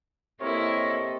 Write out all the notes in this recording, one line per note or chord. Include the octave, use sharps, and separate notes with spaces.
C3 A#3 C4 E4 A4 A#4 C#5 D#5